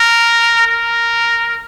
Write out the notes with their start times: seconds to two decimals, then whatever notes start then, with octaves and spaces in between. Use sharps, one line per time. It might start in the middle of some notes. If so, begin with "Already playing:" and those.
Already playing: A#4
0.66 A#4